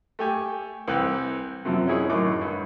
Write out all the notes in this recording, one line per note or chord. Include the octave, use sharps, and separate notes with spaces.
A3 G4 G#5
C2 E3 B4 G5 F#6
F#2 C3 F3
C#4 D#4 E4 G#4 C#5
F#2 A2 D#3 D6
G2